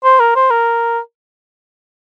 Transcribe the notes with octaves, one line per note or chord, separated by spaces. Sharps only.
C5
A#4
C5
A#4